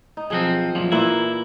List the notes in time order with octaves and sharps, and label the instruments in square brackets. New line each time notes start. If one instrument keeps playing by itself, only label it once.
[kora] D#4
[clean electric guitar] B1 F3 C4 [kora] G#4 F#5
[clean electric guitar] F#2 A#2 F3
[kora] A#2 E3 A#3 [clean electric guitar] E4